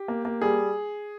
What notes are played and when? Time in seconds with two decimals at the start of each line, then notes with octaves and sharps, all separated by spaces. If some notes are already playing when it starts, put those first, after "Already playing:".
Already playing: G4
0.08 A#3
0.25 A#3
0.42 G3 G#4